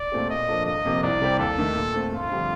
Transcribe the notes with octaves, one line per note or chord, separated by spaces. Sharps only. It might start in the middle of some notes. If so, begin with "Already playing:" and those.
Already playing: D5
A#2 A3 C4 G4
A#2 D#5
F3 A#3 D4 A4
G1 D#5
F2 C3 F3 A#3
C2 D5
C3 G3 C4 G4
D#2 A4
D#3 A3
A#2
A3 C4
G1 F4
F2 D3 G3